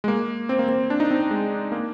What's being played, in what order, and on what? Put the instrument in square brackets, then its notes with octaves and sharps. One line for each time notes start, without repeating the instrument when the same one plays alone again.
[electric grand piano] G#3
A#3
C4
A#3
C4
D4
D#4
C4
C4
G#3
A#3